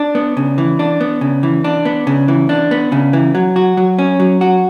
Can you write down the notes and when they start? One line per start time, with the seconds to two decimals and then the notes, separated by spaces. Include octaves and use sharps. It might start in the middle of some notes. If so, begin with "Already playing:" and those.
Already playing: D4
0.15 B3
0.37 C#3
0.58 E3
0.79 D4
1.00 B3
1.21 C#3
1.43 E3
1.64 D4
1.85 B3
2.07 C#3
2.28 E3
2.49 D4
2.71 B3
2.92 C#3
3.13 E3
3.35 F#3
3.56 F#4
3.77 F#3
3.99 C#4
4.20 F#3
4.41 F#4